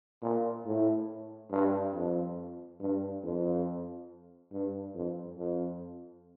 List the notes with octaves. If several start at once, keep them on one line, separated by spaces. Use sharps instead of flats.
A#2
A2
G2
F2
G2
F2
G2
F2
F2